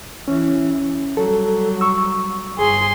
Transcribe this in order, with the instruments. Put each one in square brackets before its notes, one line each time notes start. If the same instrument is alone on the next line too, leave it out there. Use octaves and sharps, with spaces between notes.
[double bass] E3 [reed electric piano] C#4
[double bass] F#3 G3 [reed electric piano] A4
[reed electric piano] C#6 E6
[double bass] G1 [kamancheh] G#4 C6